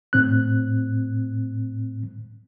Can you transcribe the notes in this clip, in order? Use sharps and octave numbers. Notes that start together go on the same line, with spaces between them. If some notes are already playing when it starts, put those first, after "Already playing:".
A2 C4 F#6